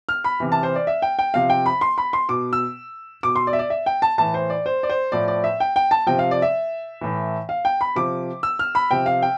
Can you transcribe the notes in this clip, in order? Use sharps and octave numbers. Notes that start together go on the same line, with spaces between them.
F6
B5
C3 E3
A5
C5
D5
E5
G5
G5
C3 F3 F5
G5
B5
C6
B5
C6
B2 D6
E6
B2 D6
C6
D5
E5
D5
E5
G5
A5
A2 E3 A5
C5
D5
C5
D5
C5
A2 F3 D5
D5
E5
G5
G5
A5
C3 F3 G5
F5
D5
E5
A2 E3
F5
G5
B5
C3 F3 D6
E6
F6
B5
C3 F3 G5
F5
G5